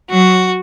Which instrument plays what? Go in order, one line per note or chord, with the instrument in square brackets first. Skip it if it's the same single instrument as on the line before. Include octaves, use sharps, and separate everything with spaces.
[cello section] F#3 [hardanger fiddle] F#4